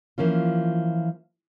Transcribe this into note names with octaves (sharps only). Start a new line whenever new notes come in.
E3 F3 A#3 C#4 F4